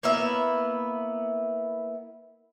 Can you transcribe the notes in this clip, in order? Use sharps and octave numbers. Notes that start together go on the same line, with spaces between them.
A#3 B3 E4 E5